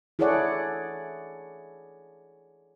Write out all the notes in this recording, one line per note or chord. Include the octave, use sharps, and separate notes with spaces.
E4 G#4 A4 C#5 D5 F#5